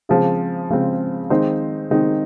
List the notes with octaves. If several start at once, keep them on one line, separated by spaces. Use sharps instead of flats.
C#3 F3 G#3 C4 G#4
C#3 F3 G#3 C4
D#3 G#3 C4 D#4 C5
D#3 G#3 C4 D#4